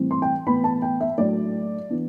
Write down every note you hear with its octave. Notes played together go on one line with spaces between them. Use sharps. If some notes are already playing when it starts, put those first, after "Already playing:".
Already playing: A2 E3 G3 C4
C6
G5
A2 E3 B3 B5
A5
G5
E5
A2 F#3 A3 D4 D5
E3 B3 D4